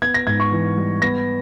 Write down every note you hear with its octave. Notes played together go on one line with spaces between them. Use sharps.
B3 G#6
A#6
G#2 G#6
C#6
E3
G3
B3 A#6